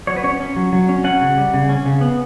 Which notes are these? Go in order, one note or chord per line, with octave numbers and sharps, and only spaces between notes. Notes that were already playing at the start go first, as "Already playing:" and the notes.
F#3 C#5
B4
C#4 C#5
C#4
F#3
F#3
C#4
C#4 F#5
C#3
G3
C#3
C#4
C#3
B3